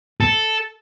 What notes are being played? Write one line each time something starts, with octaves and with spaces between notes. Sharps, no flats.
A4